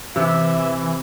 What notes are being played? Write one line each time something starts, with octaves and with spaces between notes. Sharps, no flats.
C3 E3 E5